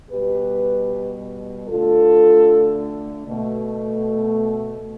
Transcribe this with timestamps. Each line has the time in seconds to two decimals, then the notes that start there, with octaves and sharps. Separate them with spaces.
0.11 B2 G3 G4 B4
1.68 D3 A3 F4 A4
3.28 B2 A3